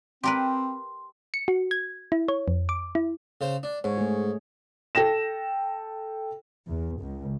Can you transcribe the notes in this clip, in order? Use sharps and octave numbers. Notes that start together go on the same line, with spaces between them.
C4 G4 A#4 B4 C6
C#7
F#4
G#6
E4
C#5
F2
D6
E4
C#3 C5
D4
G#2 C#5
A3 G#4
A4 G5 A#6 E7
E2
C#2